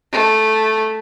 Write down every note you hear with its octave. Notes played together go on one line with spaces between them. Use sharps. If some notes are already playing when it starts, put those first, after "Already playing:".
A3